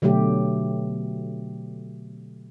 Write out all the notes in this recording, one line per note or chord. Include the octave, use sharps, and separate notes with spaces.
B2 D3 F#3 A3 G4